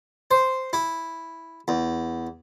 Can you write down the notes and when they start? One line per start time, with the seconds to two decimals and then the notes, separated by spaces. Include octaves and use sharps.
0.31 C5
0.73 E4
1.68 E2